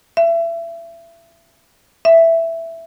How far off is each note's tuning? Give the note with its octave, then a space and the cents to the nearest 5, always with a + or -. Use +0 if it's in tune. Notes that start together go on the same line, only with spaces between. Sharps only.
E5 +30
E5 +5